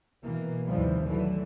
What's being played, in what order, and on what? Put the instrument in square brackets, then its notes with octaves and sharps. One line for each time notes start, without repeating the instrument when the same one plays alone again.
[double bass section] B2 E3 A#3
A#1 D#2 C3 E3 F3 G3
D3 E3 F#3 A3